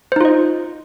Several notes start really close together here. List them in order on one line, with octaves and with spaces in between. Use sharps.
C5 D#4 F4 D#5